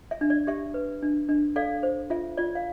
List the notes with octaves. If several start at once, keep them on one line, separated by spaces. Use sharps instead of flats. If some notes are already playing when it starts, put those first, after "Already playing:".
E5
D4
D5
G4 E5
B4
D4
D4
A4 D5 F5
C5
F4 E5
F4 D5
F5